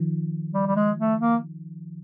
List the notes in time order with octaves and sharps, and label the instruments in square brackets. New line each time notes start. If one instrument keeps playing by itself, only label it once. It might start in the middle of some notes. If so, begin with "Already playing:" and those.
Already playing: [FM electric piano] D#3 F3
[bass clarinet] G3
G3
G#3
A3
A#3